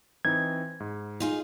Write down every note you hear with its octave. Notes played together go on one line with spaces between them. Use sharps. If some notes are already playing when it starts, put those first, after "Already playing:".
E3 C4 D#4 G#6
G#2
D#4 F4 G#4